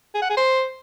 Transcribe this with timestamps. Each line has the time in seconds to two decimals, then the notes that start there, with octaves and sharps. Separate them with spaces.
0.15 G#4
0.22 F#5
0.30 G#4
0.37 C5